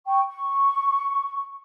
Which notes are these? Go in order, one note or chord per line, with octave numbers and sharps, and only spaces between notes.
G5 C#6
C#6